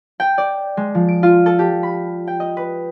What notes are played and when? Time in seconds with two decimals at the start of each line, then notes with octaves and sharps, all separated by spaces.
0.20 G5
0.38 D5
0.77 G#3
0.95 F3
1.08 D7
1.23 F4
1.46 A4
1.59 G4
1.83 B5
2.28 G5
2.40 D#5
2.57 B4